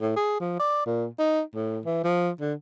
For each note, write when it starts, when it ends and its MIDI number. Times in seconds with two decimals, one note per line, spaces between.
0.01 0.12 45
0.16 0.38 68
0.40 0.55 53
0.59 0.84 74
0.86 1.07 46
1.19 1.41 63
1.55 1.80 45
1.85 2.00 52
2.04 2.30 53
2.40 2.53 50